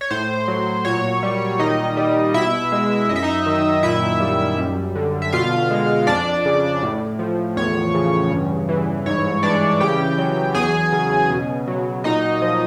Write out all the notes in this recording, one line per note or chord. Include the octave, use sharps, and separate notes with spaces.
C#5
A2 C5
F#3
A#2 C#5
G3
D#3 D#4 D#5
G3
B2 E4 E5
G#3
F#2 D#5
E5
D#4 D#5
D#3
A#2 E4 E5
G3
F#2
D3
E5
B2 F4 F5
G#3
F2 D4 D5
C#3
A2
F3
E2 C#5
C#3
G2
E3
G#2 C#5
E3 D4 D5
C#3 G4 G5
F#3
E2 G#4 G#5
C#3
B2
F#3
A#2 D#4 D#5
F3